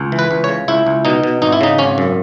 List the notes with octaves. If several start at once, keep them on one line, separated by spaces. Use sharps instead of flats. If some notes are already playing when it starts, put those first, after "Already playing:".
Already playing: C#2
E3
B4
C#2
C#5
C#3
C#2 E4
C#2
B2 D#4
B2
G#1 D#4
E4
C#3 D#4
G#1 C#4
F#2